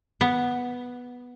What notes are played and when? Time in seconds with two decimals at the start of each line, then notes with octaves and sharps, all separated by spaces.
0.21 B3